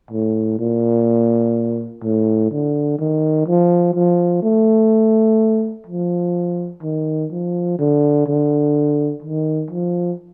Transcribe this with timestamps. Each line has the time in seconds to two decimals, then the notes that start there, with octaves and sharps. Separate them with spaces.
0.11 A2
0.59 A#2
2.03 A2
2.51 D3
2.99 D#3
3.47 F3
3.94 F3
4.43 A3
5.86 F3
6.82 D#3
7.31 F3
7.79 D3
8.27 D3
9.23 D#3
9.70 F3